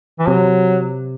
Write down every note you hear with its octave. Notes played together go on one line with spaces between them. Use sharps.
E3
C3 F#3